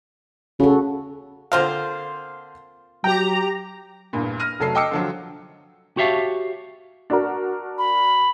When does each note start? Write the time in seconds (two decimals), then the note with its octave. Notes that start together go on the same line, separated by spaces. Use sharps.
0.60 C#3 F#4 A4
1.52 D3 A#3 C4 F4 C5 F5
3.04 F#3 G4 G5 A#5
4.13 E2 G2 A#2
4.40 F6 A#6 D#7
4.60 F1 F#3 A3 A4 C7
4.75 D#5 G5 D6 E6 C#7
4.91 D3 F3 F#3
5.97 F#4 G4 C#5 E5 F5 A5
7.10 D4 F#4 A#4
7.78 B5